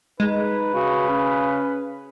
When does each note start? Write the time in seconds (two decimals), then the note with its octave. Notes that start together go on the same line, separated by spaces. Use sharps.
0.20 G#3 D#4 B4
0.74 C#3 F#4
1.09 C#4